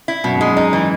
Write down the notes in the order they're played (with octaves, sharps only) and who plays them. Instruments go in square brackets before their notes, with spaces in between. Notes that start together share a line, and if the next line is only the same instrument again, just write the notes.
[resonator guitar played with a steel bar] E4
[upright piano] F#2 [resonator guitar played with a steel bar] B2
[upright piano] G#2
[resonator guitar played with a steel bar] G#3
[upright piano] F#2
[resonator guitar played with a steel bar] D#4
E3